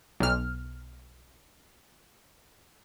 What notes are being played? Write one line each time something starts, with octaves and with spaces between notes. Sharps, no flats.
B1 F6